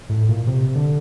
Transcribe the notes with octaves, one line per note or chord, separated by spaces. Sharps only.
A2
A#2
C3
D3